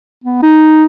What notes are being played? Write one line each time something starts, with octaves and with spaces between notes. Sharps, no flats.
B3
D#4